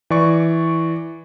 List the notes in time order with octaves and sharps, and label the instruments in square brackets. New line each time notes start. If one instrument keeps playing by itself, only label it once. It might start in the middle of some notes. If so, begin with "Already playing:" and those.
[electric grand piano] E3 D5 C#6